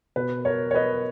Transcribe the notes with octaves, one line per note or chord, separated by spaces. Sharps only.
B2 B4
A#4 C#5
C#5
B4 D#5